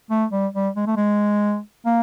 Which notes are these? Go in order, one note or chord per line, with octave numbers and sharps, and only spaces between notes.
A3
G3
G3
G#3
A3
G#3
A#3